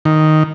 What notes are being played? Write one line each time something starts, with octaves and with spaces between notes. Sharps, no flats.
D#3